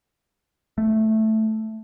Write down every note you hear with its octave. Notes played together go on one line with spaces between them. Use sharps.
A3